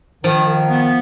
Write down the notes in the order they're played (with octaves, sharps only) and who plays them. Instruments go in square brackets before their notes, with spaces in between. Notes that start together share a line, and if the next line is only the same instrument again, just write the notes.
[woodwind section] D#3 [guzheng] F3
[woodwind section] D#3
B3